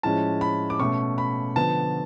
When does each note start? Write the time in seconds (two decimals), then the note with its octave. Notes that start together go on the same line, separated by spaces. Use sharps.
0.03 A2 F3 G#3 C#4 A5
0.41 B5
0.70 D6
0.79 B2 A3 C#4 C#6
1.18 B5
1.56 D3 F3 B3 A5